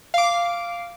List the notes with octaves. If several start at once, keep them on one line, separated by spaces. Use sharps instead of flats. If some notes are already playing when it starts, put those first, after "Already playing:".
F5 D6